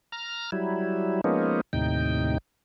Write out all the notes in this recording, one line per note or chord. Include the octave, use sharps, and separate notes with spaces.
A#5 F6
F#3 G3 E4
F3 G#3 A#3 B3 C#4 D#4
D#2 A2 C3 D#4 G5